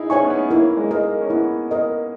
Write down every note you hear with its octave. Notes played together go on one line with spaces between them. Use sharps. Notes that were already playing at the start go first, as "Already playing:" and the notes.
Already playing: D#4 E4 G#4
C#4 C#5 G#5 C#6
B3
C#4
A#3 E4
G#3
A#4 D#5
A#3
C#4
B3 E4
A#4 D#5